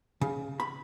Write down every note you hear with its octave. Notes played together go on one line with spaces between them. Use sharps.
C#3
B5